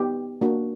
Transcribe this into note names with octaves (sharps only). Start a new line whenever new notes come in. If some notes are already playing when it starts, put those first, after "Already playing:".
Already playing: B3 D#4 G4
A#3 D4 F#4